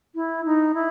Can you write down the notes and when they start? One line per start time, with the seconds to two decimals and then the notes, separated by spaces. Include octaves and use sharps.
0.15 E4
0.45 D#4
0.74 E4